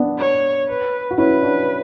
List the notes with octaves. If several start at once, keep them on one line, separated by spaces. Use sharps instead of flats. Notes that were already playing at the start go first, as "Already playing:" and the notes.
Already playing: B3 D4
C#5
B4
F#4
C#4 E4 B4
D4 F#4